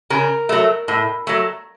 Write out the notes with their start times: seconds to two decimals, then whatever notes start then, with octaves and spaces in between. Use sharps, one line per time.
0.10 C#3 A#4
0.49 F#3 A3
0.88 A2
1.27 F#3 A3